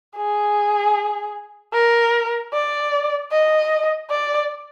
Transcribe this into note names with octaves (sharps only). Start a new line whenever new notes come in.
G#4
A#4
D5
D#5
D5